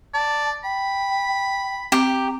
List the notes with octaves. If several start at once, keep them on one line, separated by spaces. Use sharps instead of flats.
D5 A5
G5 B5
C4 G4 A#5